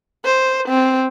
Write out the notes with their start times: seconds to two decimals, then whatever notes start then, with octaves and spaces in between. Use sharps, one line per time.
0.25 C5
0.68 C4